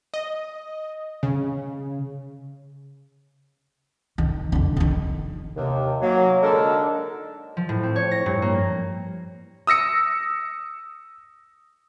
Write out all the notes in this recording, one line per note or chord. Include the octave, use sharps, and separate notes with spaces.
D#5
C#3
D#3
F2 D3
D3 D#3
D#2 C3
F#3 A#3
D3 G#3 D4 D#4 A4 A#4
F3
A2
C4
C#5
A#6
G2
A#3
D#6 E6 A#6 C#7